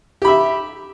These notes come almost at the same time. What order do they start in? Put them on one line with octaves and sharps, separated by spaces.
G4 B5 E5